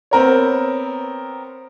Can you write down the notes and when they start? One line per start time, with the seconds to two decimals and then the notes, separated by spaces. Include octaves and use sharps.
0.11 B3 C4 A#4 C#5